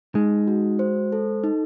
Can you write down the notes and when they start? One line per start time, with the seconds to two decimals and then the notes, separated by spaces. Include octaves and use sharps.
0.15 G#3 D#4
0.48 F#4
0.79 C5
1.12 A4
1.44 D#4